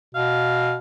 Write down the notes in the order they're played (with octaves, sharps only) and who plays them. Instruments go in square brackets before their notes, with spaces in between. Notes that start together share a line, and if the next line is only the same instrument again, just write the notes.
[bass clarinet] B2 [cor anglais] F5